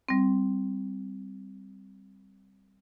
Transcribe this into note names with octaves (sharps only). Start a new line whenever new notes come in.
G3 C4